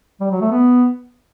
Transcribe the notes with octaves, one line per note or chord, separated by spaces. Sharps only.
G3
F#3
A3
B3